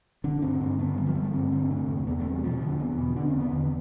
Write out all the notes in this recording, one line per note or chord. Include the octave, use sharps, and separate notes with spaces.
D3 D4
G2 C4
G2 C4
D3 B3
D3 G3
F3
G2 G3
A3
G2 C4
D3 C4
C3 A3
E2
E2 B3
A3
C3
G3
B2 F3
E2 D3
E2 B3
B2
D3 D4
C4
E2
B3
E2 D3